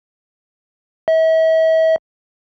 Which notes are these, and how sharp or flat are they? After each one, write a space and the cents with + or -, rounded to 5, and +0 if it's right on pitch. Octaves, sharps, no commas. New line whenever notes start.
E5 -40